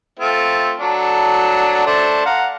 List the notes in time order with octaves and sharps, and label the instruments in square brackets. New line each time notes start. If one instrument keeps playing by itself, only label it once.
[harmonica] A3 C4 F4
F#3 D4 A4
A3 D4 C5
F5 F#5 A#5